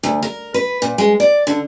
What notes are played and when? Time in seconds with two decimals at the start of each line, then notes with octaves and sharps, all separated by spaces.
0.03 D2
0.22 A#4
0.54 B4
0.82 A#2
0.98 G#3
1.20 D5
1.47 D3